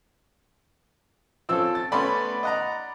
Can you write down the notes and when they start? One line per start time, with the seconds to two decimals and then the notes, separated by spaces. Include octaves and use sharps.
1.49 F3 C4 C#4 A4 E6
1.75 A6
1.92 A3 B3 C#4 D5 B5 C6
2.43 D#5 F#5 A#5